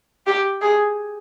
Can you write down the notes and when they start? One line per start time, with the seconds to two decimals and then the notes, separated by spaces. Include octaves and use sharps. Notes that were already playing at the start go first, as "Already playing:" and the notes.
0.27 G4
0.62 G#4